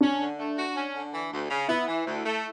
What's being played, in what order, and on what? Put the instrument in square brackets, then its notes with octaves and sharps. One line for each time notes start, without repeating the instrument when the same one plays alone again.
[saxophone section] C#4 [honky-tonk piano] D4
[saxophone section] D3
A3
F#4
C#4
D3
E3
D2
C#3
[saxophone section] B3 [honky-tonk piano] E4
[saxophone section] E3
D2
A3